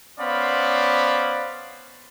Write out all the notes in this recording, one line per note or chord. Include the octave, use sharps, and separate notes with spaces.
B3 C#4 C5 D5 F5 B5